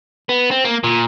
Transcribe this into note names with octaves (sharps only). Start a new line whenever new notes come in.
B3
C4
A#3
A#2